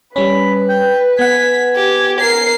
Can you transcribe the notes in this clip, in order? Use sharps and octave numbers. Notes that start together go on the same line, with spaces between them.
G3 C#4 B4 B5
G5
B3 F#5 G#5 B6
G4
A#4 C7